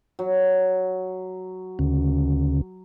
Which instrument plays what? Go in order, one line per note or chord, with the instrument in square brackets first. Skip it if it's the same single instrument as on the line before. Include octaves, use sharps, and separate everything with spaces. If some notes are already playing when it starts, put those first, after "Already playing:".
[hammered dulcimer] F#3
[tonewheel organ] D2 C#3